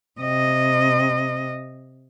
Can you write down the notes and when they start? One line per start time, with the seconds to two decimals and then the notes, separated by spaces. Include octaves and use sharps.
0.20 C3 D#5